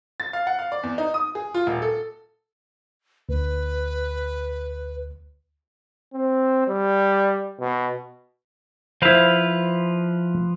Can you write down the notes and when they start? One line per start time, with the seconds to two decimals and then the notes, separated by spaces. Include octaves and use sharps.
0.20 A6
0.33 F5
0.47 F#5
0.59 F5
0.72 D5
0.83 E2
0.98 D#4
1.14 D#6
1.35 G#4
1.54 F4
1.67 D#1
1.82 A4
3.29 D2 B4
6.14 C4
6.68 G3
7.60 B2
9.02 F3 E4 B4 C5 F5